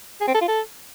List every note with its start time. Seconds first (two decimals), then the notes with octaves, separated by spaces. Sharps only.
0.21 G#4
0.28 C4
0.34 A4
0.41 F4
0.48 A4